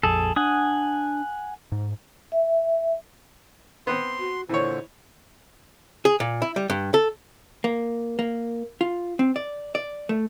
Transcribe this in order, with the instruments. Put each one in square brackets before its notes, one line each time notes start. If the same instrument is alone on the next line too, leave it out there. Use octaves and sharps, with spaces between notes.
[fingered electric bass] A#1 F2 [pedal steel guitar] G#4 A4
[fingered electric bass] D4 [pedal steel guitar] F#5 G#5 D#6
[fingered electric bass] G#2
[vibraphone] E5
[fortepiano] B3 C4 [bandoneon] C6
[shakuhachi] F#4
[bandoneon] A#2 D3 [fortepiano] E3 C#5 [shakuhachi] C5
[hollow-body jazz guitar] G#4
A#2
E4
G3
G2
A4
A#3
A#3
F4
C4
D5
D5
A3